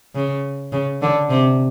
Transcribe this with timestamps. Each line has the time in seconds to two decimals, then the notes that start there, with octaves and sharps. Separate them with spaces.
0.15 C#3
0.72 C#3
1.02 D3
1.30 C3